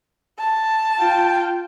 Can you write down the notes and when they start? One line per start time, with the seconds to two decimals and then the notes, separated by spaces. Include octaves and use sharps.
0.39 A5
0.99 F4 G5